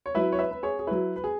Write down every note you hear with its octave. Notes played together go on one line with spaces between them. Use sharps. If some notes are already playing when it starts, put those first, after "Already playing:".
C#5
F#3 E4 B4 E5
C#5
B4 E5
B4
G#4 C#5
G#4
F#3 E4 B4
B4
G#4